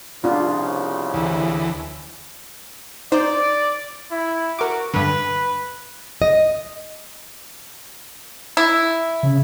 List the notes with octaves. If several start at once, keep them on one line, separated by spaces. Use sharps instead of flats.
C2 C#3 F3 D4 F4
D2 E3
D#4 C5 D5
E4
F#4 A#4 D6
G2 D3 B4
D#5
E4
C#3